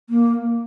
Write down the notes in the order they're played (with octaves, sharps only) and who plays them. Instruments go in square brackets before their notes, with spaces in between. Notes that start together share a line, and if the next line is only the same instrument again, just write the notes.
[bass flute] A#3